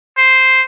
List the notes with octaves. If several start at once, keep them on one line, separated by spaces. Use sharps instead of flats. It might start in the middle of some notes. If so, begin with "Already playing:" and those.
C5